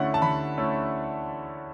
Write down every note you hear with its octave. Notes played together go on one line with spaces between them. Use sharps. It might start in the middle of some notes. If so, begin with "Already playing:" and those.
Already playing: D3 A3 C#4 E4 F#5
A5
D3 B5
A3 C#4 E4